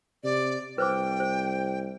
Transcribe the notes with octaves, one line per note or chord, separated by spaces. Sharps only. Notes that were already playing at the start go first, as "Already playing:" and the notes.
C3 D5
C2 B4 C5 G5 D6
C5